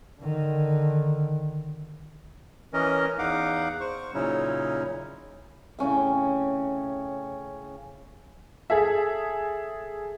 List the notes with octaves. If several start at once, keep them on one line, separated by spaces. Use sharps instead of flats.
D3 D#3
E3 C#4 A#4 D#5
E2 D#4 F5 F#5 D6
C5 C#6
A#2 C#3 F#3 C#4 D#4 E4
A2 C#3 C#4 G5
G#4 A4 E5